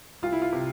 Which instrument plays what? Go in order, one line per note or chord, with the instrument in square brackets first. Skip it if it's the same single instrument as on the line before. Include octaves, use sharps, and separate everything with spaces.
[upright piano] C2 F4
E4
F4
C3